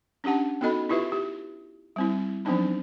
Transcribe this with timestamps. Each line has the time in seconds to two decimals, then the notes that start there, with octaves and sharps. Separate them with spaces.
0.24 C#4 D4 G4 F#5 A5
0.61 B3 D#4 F#4 A4 D#5 B5
0.89 E4 F4 G4 B4 E5
1.12 G4
1.96 G3 C4 E4
2.45 F3 F#3 B3 C4 D4 D#4